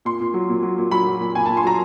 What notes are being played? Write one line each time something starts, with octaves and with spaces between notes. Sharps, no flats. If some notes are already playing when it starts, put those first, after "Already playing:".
A#2 C6
A#2
F#3
A#2
F#3
A#2
F#3 B5
F#3
A#2
A#2 G#5
A5
A#2
C6
F#3 A#5